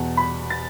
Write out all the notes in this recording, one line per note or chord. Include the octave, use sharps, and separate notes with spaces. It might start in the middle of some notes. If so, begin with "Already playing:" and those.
Already playing: E2 B2 F#5
B5
A6